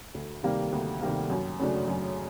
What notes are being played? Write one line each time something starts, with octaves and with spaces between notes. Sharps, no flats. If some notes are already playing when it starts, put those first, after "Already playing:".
D2
C3 D#3 G3 A#3
D2
C3 D#3 G3 A#3
F#2
C#3 F#3 A3 D4
F#2